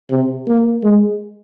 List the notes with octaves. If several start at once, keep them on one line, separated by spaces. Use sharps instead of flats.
C3
A#3
G#3